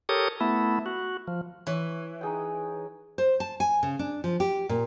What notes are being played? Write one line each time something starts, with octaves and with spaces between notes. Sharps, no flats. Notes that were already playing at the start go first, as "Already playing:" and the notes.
G4 A4 A#4 C#5 D#6
A3 B3 E4
F#4
F3
E3 C#5
D#4 G#4 G5
C5
A5
G#5
C#3
D4
F3
G4
A#2